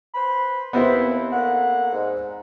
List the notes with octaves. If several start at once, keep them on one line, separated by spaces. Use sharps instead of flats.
B4 C5 B5
D#2 B3 C4 E4
D3 A#3 F#5
G#2